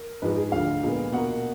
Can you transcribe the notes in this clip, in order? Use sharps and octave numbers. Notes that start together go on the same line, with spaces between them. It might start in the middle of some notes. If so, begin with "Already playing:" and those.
Already playing: A#4
G#2 F3 G#3 B4
G#4
D2 D3 F3 F5
A#2 G#3 B3
B2 A#3 F#5